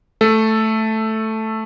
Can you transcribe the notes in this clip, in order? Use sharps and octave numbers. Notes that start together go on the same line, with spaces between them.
A3 A4